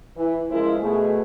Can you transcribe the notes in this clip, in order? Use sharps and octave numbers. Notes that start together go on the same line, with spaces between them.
E3
C#3 F3 G#3 E4 A#4 C5
B2 A3 G#4